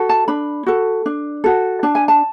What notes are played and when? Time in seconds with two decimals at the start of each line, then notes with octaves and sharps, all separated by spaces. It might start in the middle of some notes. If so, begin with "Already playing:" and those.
Already playing: F#4 A4
0.09 A5
0.28 D4 B5
0.66 F#4 A4
1.06 D4
1.44 F#4 A4
1.83 D4 A5
1.95 G#5
2.08 A5